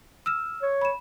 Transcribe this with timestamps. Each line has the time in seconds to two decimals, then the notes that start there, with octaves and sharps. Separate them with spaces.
0.26 E6 F6 E7
0.62 C#5
0.81 B5 E7